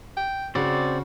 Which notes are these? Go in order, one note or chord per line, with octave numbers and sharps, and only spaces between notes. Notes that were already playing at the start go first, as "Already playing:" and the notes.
G5
C#3 C4 F#4 D5